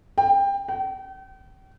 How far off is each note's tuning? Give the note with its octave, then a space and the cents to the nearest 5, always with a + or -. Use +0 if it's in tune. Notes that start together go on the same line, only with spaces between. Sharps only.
G5 +20
G5 -40